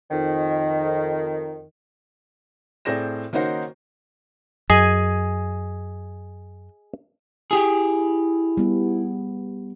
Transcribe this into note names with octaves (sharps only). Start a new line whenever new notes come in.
F2 D#3
A2 C4 G#4 D5 A#6 E7
D#3 A#3 C#4 D#4 F#4 C5
F#2 G#4 D#5 G#5
E4 G4 G#4
G3 B3